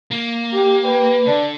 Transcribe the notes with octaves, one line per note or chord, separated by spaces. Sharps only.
A#3
G4
G4 B4
D3 D4